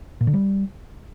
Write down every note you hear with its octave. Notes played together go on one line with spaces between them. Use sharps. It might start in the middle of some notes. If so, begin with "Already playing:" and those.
A#2
D3
G3